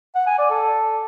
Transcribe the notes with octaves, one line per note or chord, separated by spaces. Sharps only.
F#5
G#5
D5
A4